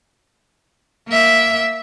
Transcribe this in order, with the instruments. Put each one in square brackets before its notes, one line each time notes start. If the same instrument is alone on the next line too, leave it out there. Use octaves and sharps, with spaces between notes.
[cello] A#3 E5